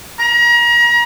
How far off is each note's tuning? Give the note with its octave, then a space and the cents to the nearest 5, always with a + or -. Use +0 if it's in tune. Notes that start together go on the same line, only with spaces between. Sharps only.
A#5 +35